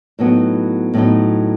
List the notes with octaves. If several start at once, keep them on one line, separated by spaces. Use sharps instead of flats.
A2 F#3 B3 D#4
A2 F#3 B3 D#4